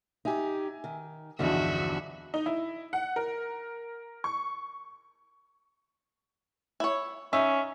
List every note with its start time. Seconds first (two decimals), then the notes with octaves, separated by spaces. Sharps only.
0.25 D#4 G4 E5 G#5
0.84 D#3
1.39 B1 E2 G2 D3 F3 C4 F#4 E5
2.34 D#4
2.46 E4
2.93 F#5
3.16 A#4
4.24 C#6
6.80 E4 C#5
7.33 C#4 D#4 E5